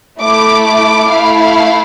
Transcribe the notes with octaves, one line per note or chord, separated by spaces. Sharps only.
A3 E4 A4 D6
D6
A3 E4 A4 F5
F5